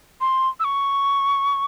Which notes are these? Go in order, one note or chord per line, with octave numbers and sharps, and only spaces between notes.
C6
E6
C#6